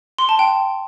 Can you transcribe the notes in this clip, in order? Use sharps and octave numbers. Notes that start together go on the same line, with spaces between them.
C6
A5
G5